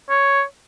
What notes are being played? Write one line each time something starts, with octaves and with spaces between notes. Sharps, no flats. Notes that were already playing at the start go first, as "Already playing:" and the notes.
C#5